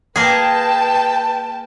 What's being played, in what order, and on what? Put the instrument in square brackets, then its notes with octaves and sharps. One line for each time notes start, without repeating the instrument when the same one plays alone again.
[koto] A#3 G#4 [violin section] B4 G5 A5